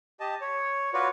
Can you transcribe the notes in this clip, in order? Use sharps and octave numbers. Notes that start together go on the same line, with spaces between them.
G4 D#5 A5
C#5
F4 F#4 B4 C#5 D5